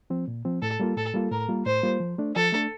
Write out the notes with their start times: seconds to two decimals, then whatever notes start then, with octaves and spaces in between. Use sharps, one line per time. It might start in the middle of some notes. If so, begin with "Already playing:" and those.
0.10 F3 C4
0.28 A#2
0.45 F3 C4
0.62 A2 A4
0.80 G3 A#3 F4
0.97 A2 A4
1.14 G3 A#3 F4
1.32 A2 A#4
1.49 G3 A#3 F4
1.66 A2 C5
1.83 G3 A#3 F4
2.00 F3
2.18 A3 D4
2.36 F3 A4
2.52 A3 D4